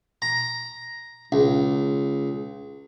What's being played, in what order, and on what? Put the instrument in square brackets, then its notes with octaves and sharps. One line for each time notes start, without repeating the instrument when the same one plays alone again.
[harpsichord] A#5
C#2